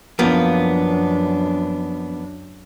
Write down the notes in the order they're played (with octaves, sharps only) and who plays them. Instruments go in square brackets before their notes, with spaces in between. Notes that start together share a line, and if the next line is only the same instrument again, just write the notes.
[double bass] F#2 D4 [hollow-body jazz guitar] F3 A#3 B3